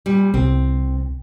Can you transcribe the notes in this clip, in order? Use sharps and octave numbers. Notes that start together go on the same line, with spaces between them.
A#2 G3
C2 C4